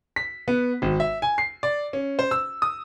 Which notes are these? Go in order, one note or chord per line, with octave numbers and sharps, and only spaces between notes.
B6
B3
G#1
E5
G#5
C7
D5
C#4
C5
E6
D#6